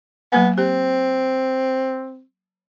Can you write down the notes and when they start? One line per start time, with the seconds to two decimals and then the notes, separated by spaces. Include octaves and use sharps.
0.32 F#3 A#3 B3 G#5
0.58 C4 G4